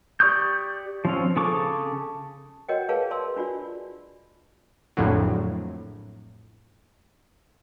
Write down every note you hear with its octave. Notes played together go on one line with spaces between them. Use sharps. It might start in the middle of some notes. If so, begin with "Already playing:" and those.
G4 D5 C#6 D#6 G6
F3 C4 C#4
C#3 G#4 A4 C#6 D6
F#4 A#4 C#5 D#5 F#5 G5
G#4 A#4 B4 C#5 F5 A5
D5 A5 C6 E6
D4 F4 F#4 D5
A#1 F2 A2 D3 F#3